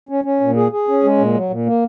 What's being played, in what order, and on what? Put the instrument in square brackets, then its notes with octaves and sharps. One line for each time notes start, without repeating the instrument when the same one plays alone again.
[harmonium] C#4
C#4
A#2
G#4
G#4
C#4
G#3
A#2
F#3
A#2
A#3